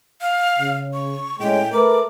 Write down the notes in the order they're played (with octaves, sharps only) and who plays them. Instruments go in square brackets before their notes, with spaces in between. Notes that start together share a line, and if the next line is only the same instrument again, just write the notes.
[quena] F5
[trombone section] C#3
[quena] C#6
[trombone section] A2 G#3 C#4 [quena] G5
[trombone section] A3 A#4 B4 [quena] D6